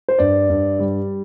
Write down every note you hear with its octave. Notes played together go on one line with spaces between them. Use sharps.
C5
G2 D5
G2
G3